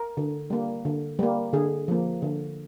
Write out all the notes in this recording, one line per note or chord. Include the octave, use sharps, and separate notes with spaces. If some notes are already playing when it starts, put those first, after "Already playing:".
Already playing: A#4
D3
G3 A#3
D3
G3 A#3
D3 G#4
F3 A#3
D3